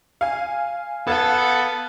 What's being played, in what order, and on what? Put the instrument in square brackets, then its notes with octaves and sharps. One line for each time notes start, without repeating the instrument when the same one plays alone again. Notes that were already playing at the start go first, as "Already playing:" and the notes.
[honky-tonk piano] F5 G#5
[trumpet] B3 [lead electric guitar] A4 A5 [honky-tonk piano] F5 G#6